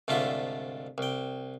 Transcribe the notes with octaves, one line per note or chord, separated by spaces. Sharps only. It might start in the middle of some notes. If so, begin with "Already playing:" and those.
C2 G#2 D3 A3 F4 E5
C2 G5